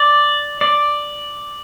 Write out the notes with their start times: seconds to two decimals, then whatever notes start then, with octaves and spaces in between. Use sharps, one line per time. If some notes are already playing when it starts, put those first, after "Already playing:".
Already playing: D5
0.61 D5